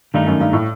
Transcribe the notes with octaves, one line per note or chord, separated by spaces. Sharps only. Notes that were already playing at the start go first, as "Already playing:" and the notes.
G2 D#3 A3 D#4
F#2
G2
A2